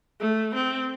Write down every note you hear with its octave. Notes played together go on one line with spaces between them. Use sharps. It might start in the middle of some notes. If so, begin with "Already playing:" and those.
A3
C4